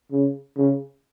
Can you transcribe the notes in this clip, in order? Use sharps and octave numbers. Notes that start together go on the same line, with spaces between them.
C#3
C#3